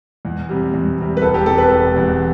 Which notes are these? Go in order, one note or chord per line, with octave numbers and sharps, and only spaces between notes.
E2
C3 G3
E2
C3 G3
B4
E1 A4
G4
E2 C3 A4
B4
E1 A4
E2 C3